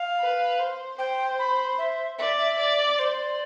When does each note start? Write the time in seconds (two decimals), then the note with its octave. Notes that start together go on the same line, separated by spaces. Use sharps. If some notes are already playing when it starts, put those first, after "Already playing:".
Already playing: F5
0.20 B4
0.59 C5
0.99 C5 G5
1.39 B5
1.78 E5
2.18 D5 E5
2.39 E5
2.59 D5
2.99 C5 D5